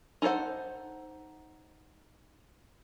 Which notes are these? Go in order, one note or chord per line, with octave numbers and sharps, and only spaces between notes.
D#4 A4 A#4 C5 F#5